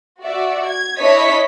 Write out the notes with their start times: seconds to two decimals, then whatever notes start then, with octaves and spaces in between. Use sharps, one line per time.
0.23 F#4 D5 E5
0.67 G#6
1.01 D4 E4 C#5 D#5 B6